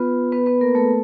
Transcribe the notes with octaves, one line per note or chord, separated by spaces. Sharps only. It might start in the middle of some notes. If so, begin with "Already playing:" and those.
Already playing: B3 F4 B4
B3 B4
B3 B4
A#3 A#4
A3 A4